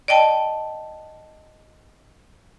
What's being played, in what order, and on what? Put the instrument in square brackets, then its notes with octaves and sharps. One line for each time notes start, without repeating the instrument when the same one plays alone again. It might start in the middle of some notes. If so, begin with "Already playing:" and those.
[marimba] D5 D#5 G5 A5